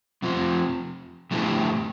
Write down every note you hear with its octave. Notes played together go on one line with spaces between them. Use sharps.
F2 C3 F3
F2 D3 A3 E4 G4